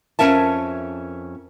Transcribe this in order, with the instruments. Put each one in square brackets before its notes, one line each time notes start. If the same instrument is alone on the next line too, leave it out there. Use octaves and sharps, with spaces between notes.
[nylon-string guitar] F2 B3 C#4 A#4 E5 A5